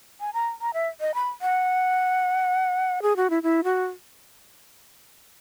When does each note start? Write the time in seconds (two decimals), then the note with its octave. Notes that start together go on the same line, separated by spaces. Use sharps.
0.21 G#5
0.34 A#5
0.61 A#5
0.74 E5
1.01 D#5
1.15 B5
1.42 F#5
3.02 G#4
3.16 F#4
3.30 E4
3.43 E4
3.64 F#4